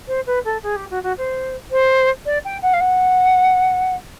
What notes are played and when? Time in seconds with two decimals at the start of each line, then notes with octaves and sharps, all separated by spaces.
0.08 C5
0.26 B4
0.45 A4
0.63 G#4
0.76 G4
0.90 F#4
1.03 F#4
1.18 C5
1.71 C5
2.26 D5
2.45 G5
2.62 F#5
2.73 F5
2.80 F#5